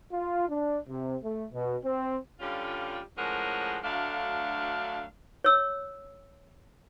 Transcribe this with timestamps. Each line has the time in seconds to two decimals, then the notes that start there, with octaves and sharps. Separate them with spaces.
0.13 F4
0.49 D4
0.89 C3
1.23 A3
1.53 B2
1.84 C4
2.40 D3 G3 C#4 F4
3.17 A2 F3 G#3 C#4 A#4 F#5
3.84 D2 F#3 A3 D4 F5
5.44 C#5 E6